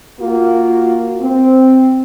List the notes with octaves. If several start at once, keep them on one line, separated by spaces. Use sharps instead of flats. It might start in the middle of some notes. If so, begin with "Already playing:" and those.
A#3 F4 F#4
C4